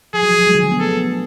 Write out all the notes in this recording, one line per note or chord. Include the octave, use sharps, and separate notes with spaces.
F3 G#4
F#3
F3
F#3
G#3
D3
A3
B3
A4